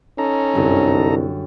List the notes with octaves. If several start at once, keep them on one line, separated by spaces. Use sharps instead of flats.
C#4 D#4 A4 A#5
G1 C2 F#2